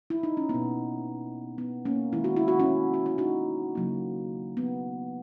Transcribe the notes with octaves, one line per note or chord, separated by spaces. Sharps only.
E4
D#4
C#4
B2 A#3 B3
B3
A#3 C#4
D#3 G#3 E4
F#4
E4
F#4
C#4 E4
F#4
E4
D#4 F#4
C#3 F#3 A#3
B3